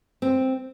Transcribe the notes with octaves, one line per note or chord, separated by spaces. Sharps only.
C4